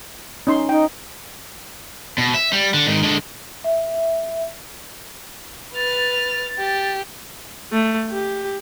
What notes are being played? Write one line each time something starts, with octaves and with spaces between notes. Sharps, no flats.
C#4 D#4 C6
D#4 G5
B2
E5
G3
D3
G#2 D#3
D3 G#3
E5
B4 F6 A6
G4
A3
G4